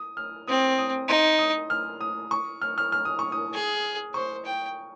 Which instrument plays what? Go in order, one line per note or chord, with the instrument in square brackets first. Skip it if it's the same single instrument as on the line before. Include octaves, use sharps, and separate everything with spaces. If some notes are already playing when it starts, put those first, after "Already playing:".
Already playing: [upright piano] D#6
F6
[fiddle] C4 [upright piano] D#6
[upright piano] D#6
[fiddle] D#4 [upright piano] C6
[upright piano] D#6
F6
D#6
C#6
F6
F6
F6
D#6
C#6
D#6
[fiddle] G#4
[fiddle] C5 [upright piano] C#6
[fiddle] G5